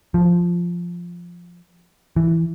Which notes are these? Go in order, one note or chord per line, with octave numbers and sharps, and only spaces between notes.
F3
E3